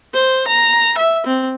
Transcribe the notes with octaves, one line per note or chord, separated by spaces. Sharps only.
C5
A#5
E5
C4